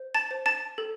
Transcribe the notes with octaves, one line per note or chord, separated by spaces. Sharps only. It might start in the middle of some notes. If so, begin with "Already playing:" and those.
Already playing: C5
A5 A6
C5
A5 A6
A4